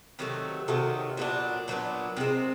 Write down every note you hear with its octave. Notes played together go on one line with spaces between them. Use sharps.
C3 D#3 F#3 A3
C3 D#3 F#3 A3
A#2 F#3 B3 D4
A#2 F#3 B3 D4
C3 F3 G#3 C4